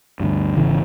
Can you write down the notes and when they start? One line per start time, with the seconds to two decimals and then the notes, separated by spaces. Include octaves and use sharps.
0.20 D2 G2
0.56 G#1 C#3 E3